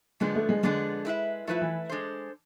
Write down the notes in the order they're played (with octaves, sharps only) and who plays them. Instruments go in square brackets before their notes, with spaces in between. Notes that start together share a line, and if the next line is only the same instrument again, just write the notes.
[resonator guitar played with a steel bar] F2 D3 F3 B3 D4 [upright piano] G#3
[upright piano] A3
G#3
[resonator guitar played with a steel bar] F2 D3 F3 B3 D4 [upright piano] G#3
[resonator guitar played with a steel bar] A3 E4 B4 E5
[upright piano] F3 [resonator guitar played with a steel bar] A3 E4 B4 E5
[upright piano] E3
[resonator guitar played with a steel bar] G#3 D4 A4 C5